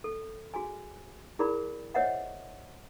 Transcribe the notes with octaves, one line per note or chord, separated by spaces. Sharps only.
A4
F#4 G#4 G#5
E4 G#4 A#4 D5 B5
C5 C#5 D#5 E5 F#5 G5